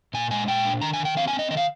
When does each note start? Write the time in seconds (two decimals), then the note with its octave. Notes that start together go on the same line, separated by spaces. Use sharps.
0.14 A#2 G#5
0.31 G#3 G#5
0.48 A#2 G5
0.65 D4
0.81 D#3 A#5
0.93 G#5
1.00 D#3
1.05 G5
1.17 C4 F5
1.28 G#5
1.33 C4
1.39 D#5
1.50 D#3 D#5
1.57 F5